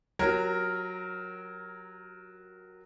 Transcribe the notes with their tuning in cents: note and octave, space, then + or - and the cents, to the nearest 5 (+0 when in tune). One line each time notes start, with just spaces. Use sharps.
F#3 -10 G4 -30 A#4 +0